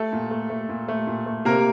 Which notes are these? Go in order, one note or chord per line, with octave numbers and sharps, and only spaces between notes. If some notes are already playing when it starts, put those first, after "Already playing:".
Already playing: A3 A4
A#2
A3
A3
A#2
A3
A#2
A3
C3 A#3 A#4